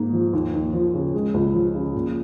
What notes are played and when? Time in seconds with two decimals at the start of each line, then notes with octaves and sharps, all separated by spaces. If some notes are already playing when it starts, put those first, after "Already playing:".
Already playing: G#2 A#3
0.13 F3
0.33 D#2
0.53 D#2
0.73 F3
0.94 C#3
1.14 G#3
1.34 C#2
1.54 F3
1.75 C#3
1.95 A#2